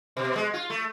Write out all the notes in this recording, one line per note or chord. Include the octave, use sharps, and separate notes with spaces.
B2
G#3
F4
A3